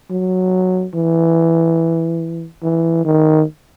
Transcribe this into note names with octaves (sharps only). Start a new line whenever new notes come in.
F#3
E3
E3
D#3